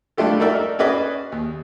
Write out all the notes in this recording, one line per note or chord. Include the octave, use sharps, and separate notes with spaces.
G3 A3 D4 F4 G4 A4
D#4 F#4 A4 A#4 D5 E5
C#4 F#4 G#4 B4 D5 D#5
D#2